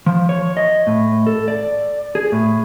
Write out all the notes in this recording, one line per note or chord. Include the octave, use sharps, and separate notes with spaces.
F3
C#5
D#5
A2
A4
D5
G#4
A2